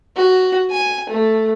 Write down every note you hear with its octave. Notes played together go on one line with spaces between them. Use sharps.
F#4
G#5
A3